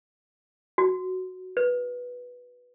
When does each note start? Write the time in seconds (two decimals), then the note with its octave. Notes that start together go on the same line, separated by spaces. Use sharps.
0.78 F#4
1.57 B4